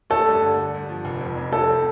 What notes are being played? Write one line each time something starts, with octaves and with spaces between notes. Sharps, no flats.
A3 A4
G2
D3
D3
G2
F3
F1
F2
F2
C2 A4
C4